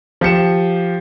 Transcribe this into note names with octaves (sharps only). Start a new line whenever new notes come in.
F3 G4 C#7 E7